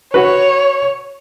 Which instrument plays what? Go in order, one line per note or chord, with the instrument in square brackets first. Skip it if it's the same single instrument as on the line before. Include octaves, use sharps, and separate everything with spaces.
[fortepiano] F#4 B4 [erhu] C#5